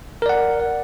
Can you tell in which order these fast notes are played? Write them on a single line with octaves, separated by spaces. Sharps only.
A#4 D5 F#5